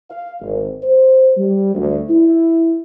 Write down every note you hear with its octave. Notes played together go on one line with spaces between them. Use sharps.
F5
G#1
C5
G3
D2
E4